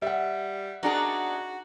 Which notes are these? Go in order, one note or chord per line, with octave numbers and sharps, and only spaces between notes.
G3 E5 F#5
B3 D4 D#4 F#4 G#4 A#4 A#5